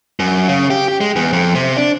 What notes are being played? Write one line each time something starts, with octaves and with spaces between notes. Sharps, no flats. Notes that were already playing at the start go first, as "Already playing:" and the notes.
F#2
C#3
G4
G4
G#3
E2
F2
C3
D4